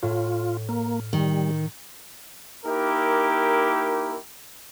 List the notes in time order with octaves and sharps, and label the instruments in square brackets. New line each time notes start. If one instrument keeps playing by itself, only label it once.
[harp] A2 [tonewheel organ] F4
[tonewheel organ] A#3 [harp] F6
[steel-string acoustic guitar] D#3 [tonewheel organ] G3
[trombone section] A#3 D#4 E4 G4 A#4